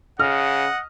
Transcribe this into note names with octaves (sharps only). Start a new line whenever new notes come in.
C#3 D#5 F#5 F6